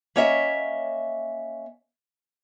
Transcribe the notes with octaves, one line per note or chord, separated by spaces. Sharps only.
A#3 C#4 C#5 D#5 E5